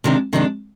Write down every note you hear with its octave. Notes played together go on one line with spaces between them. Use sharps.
C3 D#3 G#3 D4
C3 D#3 G#3 D4